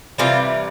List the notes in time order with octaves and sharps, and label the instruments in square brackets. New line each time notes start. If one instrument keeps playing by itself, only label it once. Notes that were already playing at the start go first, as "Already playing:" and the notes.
[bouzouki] C3 E3 G3 F4